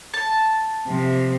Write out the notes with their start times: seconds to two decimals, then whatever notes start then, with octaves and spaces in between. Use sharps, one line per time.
0.14 A5
0.87 C3 F3